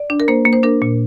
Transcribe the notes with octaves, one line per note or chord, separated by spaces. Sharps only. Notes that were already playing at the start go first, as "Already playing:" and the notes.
Already playing: D5
D4
A#4
A#3 C5
A#3
C5
D4 A#4
A#2